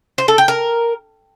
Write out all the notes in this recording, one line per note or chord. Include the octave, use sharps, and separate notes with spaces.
C5
A4
G5
A#4